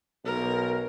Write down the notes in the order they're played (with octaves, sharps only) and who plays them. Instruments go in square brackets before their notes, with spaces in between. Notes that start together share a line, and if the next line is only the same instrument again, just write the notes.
[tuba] B1 [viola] A#4